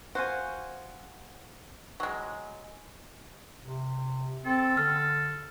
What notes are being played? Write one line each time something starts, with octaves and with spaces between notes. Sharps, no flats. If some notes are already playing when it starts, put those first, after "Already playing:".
F#4 C5 F5 G#5
F#3 G#3
C3
C4 A4
D3 F6